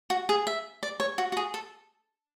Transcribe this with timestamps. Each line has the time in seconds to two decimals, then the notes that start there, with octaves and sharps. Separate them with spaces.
0.10 F#4
0.29 G#4
0.47 E5
0.83 D5
1.00 C#5
1.18 F#4
1.32 F#4
1.37 G#4
1.54 A4